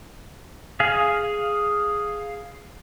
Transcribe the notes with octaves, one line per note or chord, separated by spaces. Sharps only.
G#4 F5